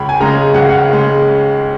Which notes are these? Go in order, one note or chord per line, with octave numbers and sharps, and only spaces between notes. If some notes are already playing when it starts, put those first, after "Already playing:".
Already playing: C#2 B5
G#5
C#3 G#3 A#5
C#2 F#5
F5
F#5
C#3 G#3